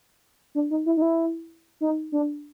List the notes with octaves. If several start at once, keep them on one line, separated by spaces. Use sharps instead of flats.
D4
D#4
E4
D#4
E4
D#4
D4